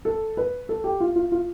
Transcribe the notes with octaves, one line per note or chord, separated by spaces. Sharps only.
A4
B4
A4
G4
F4
F4
F4